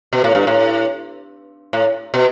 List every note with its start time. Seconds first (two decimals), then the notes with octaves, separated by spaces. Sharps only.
0.13 B2
0.24 A2
0.35 G2
0.47 A2
1.73 A2
2.14 B2